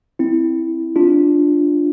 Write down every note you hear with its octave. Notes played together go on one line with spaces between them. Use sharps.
C4 E4
D4 F4